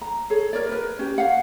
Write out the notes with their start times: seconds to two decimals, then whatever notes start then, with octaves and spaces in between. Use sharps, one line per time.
0.01 A#5
0.30 G#4 A4 C#5
0.53 A#4 C#5 D5
0.69 A#4 B4
0.99 C#4 G4
1.18 F5 F#5